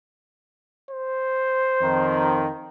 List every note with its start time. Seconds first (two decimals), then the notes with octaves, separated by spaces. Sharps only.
0.91 C5
1.81 F2 D#3